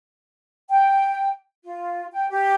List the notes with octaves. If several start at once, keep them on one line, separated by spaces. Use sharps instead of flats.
G5
F4
G5
G4